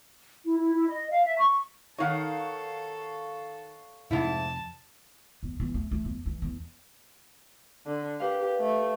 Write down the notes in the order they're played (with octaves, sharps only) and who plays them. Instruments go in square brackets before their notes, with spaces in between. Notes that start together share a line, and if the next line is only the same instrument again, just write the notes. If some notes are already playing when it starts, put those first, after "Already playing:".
[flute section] E4
E4
E4
D#5
F5
E5
C#6
[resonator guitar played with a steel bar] D#3 D#4 [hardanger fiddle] A4 [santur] C#5 F5 F#5
[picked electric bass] F2 C3 [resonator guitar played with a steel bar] G#2 E4 [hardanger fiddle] A5
[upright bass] E2
E2
A3
A3
E2
E3
E2
[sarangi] D3
[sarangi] G4 [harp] A#4 B4 F5
[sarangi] A3